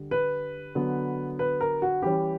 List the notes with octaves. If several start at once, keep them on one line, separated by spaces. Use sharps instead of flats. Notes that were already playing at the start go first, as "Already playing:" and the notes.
Already playing: D3 G3
B4
D3 F#3 B3
B4
A#4
F#4
E3 G3 C#4 G4